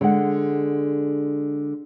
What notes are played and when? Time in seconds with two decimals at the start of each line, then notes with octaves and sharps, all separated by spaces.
0.01 D3 G#3 F#5